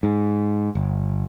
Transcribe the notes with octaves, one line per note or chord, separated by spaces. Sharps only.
G#2
G1